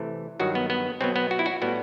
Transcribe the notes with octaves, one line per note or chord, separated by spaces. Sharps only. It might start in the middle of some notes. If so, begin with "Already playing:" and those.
Already playing: C3 E3 A3
G2 D#3 F#3 F#4
B3
B3
B2 F#3 B3 C4
B3
F#4
E4
F#4
A2 G3 B3 F#4